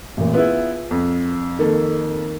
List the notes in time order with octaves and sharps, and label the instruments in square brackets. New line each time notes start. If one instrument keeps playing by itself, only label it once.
[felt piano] A1 A#2
[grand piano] B3 E4 [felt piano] F4 G#4
[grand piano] F2
[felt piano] D#3 A#3 A4